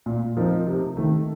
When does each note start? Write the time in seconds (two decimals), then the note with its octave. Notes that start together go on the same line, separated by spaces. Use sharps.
0.06 A#2
0.37 F3 C4 D#4 A#4
0.67 C3
0.97 D#3 A3